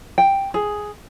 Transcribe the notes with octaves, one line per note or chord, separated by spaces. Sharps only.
G5
G#4